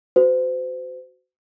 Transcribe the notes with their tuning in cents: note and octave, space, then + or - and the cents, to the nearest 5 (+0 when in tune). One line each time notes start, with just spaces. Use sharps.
F#4 +0 C5 -35